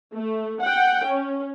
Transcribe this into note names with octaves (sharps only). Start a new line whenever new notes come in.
A3
F#5 G5
C#4